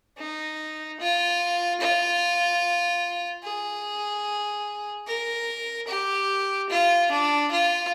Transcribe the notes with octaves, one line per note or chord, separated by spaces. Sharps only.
D#4
F4
F4
G#4
A#4
G4
F4
D4
F4